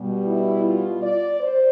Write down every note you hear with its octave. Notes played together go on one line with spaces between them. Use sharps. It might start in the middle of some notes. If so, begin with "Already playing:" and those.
Already playing: B2 G3
E4
F4
D5
C5